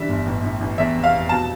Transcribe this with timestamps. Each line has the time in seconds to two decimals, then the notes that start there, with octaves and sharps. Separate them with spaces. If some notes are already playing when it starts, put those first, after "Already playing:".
Already playing: D3 E3 G3 E5
0.09 G1
0.26 A1
0.43 A2
0.61 A1
0.78 E2 E5
0.95 F1
1.04 F5
1.13 F1
1.29 B2 A5